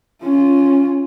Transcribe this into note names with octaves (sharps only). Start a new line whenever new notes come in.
C#4 F4